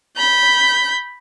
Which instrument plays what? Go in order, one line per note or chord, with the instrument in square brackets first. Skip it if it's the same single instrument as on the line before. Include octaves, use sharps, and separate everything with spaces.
[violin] B5 G6